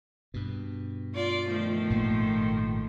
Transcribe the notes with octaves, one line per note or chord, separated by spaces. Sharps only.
G2 B2
F4 D5
D#3 F3 A3
G#1 A#2 A#3